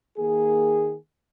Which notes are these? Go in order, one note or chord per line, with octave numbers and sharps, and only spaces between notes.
D#3 A#3 G#4